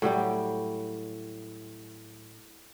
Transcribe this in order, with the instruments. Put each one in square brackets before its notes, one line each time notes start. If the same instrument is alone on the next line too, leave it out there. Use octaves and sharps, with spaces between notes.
[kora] A2 F#3 G3 G5